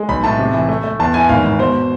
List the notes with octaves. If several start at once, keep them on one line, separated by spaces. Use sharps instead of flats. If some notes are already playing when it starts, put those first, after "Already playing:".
Already playing: G#3
B1 B5
A2 A5
C3
E3
A3
A3
E2 A5
E3 G#5
G#1 F5
G#2
B2 C5